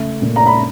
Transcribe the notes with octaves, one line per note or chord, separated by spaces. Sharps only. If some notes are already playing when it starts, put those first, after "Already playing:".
Already playing: C#3 A3
A#2
A#5
B5